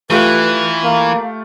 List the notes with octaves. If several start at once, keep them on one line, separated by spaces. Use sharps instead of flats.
E3 A3 F4 G4 B4
A#3 F5